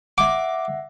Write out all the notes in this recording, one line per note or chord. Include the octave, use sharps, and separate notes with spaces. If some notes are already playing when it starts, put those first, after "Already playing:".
E5 F#5 D6